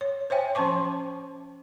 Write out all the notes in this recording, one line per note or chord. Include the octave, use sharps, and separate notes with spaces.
C#5
C5 C#5 E5 G5 G#5
F3 C#4 C5 A5 C#6 D6